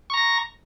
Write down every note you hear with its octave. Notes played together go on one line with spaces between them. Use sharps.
A#5 C#6 A#6